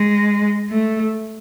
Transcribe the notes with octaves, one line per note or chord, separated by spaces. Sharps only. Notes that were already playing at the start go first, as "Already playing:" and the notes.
Already playing: G#3
A3